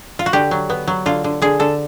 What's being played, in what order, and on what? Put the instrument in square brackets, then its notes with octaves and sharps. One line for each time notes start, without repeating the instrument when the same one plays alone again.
[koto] F4
F#4
D3 G4
F#3
B3
F#3
D3 F4
D3
D3 G#4
D3 A4